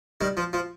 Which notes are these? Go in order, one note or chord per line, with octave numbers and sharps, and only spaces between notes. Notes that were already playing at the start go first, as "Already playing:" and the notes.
D#3 G3
F3
F3